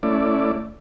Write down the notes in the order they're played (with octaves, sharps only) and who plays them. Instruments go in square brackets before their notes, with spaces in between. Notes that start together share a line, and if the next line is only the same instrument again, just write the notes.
[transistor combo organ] A3 C#4 E4 D5